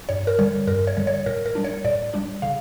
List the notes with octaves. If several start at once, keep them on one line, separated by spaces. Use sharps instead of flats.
G2 C#5
A#4
D3 G3 C#5
G2 A#4
C#5
D3 G3
C#5
A2 A#4
A#4
G3 D4
C#5
A2 D5
G3 D4
C#3 F5